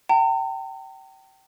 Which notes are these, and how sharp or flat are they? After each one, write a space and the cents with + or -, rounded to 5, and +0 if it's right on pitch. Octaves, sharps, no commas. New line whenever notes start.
G5 -25 A#5 -45